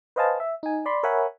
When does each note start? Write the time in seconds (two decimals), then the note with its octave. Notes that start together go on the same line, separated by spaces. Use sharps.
0.16 B4 C5 D#5 F5 G#5 A5
0.40 E5
0.63 D#4 G#5
0.86 D5 B5 C6
1.03 A#4 C#5 E5 F#5 G#5 B5